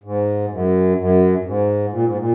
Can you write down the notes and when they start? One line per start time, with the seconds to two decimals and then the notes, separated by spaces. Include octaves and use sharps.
0.04 G#2
0.51 F#2
0.98 F#2
1.39 F#2
1.44 G#2
1.92 A#2
2.04 G#2
2.17 A#2